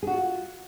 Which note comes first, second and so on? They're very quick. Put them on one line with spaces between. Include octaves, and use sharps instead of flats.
G#4 F#4 F4